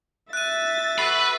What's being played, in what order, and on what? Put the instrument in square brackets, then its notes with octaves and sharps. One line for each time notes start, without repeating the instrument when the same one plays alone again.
[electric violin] E5 A6 [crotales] F#6 D#7
[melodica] F#4 A4 [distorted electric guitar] B4 B5 [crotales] C7